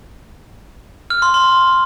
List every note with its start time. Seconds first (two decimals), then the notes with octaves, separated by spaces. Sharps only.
1.10 F6
1.22 C6
1.34 C6